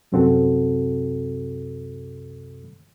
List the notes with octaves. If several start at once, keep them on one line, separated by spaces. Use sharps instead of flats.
C2 F#2 C3 C4 F#4 A4